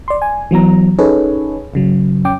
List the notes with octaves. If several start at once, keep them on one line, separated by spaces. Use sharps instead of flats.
D5 C6
G#5
E3 F#3 B3 A#5
C#4 D#4 G#4 A4 B4 C#5
G1 C#3 F#3
F2 C#4 G5 D6